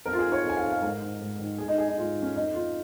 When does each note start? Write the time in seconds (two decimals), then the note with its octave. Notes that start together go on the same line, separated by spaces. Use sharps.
0.06 F2 A#4
0.13 F4
0.18 G#4
0.25 D#3
0.32 C#5
0.44 F2
0.49 G#5
0.57 F5
0.64 D#3
0.70 F5
0.82 G#2 A#4
1.01 D#3
1.20 G#2
1.39 D#3
1.58 G#2 G#4
1.68 D#4
1.78 D#3 G#4
1.88 D#4
1.97 G#2 F4
2.16 D#3
2.22 C#4
2.36 F2 D#4
2.54 D#3 F4